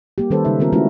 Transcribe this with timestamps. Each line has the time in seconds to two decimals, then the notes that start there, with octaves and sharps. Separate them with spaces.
0.18 G3 A#3 G4
0.30 D#3 G3 C#4 A4 B4 C5
0.45 C#3 G#3 D#4 E5
0.60 D#3 B3 C#4 F4 A#4
0.73 G#3 A3 C#4 D#4 E4 F#4